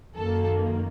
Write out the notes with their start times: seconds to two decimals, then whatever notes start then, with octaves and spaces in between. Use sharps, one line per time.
0.14 F#2 D#3 A#3 A4